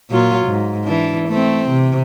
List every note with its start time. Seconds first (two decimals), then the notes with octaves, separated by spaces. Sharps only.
0.11 A#2 F#3 F4
0.46 G#2
0.85 E3 D4
1.28 A3 C4
1.69 C3